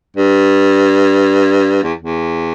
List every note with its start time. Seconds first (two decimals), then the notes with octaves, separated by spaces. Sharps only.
0.17 G2
1.83 E2
2.02 E2